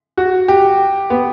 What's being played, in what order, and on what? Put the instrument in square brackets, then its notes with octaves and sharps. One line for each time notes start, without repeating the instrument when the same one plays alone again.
[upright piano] F#4
G4
B3